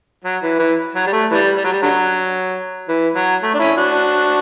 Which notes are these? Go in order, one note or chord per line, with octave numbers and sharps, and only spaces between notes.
F#3
E3
E3
F#3
G3
A3
E3 G3
G3
F#3
G3
D3 F#3
E3
F#3
A3
D4
C#4 E4
D4 F#4